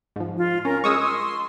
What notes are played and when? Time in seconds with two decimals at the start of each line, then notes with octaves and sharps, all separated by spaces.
0.16 G#2 F3
0.38 F4
0.65 C#4 A#4
0.84 G#3 C#6 D#6 E6
0.98 C6